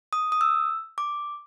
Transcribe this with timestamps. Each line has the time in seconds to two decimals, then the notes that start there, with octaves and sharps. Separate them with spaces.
0.13 D#6
0.32 D#6
0.41 E6
0.98 D6